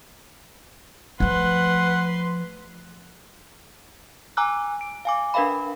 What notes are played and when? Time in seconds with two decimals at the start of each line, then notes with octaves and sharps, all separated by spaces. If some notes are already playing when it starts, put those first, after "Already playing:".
1.20 F3 A3 B4 F#5 C6
4.37 G#5 A#5 D6 E6 F#6
4.81 D7
5.05 F5 G#5 D6
5.34 D4 A#4 B4 E5 F5 B5